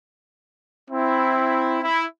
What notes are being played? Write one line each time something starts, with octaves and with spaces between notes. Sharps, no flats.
C4 E4
E4